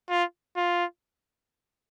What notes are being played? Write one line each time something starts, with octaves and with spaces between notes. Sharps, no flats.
F4
F4